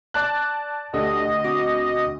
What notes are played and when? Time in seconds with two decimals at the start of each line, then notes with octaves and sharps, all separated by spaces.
0.14 D5 A5 F#6
0.94 D2 G4 A4 D5 D#5
1.44 C4 F#4 D6